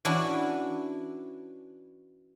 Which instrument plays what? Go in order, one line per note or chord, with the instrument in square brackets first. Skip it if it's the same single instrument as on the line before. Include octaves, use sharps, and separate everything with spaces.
[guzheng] E3 C#4 D4 E4 F#4